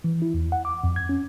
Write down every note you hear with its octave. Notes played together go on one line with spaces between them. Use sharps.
E3
E4
E2
F#5
D6
F2
G#6
C#4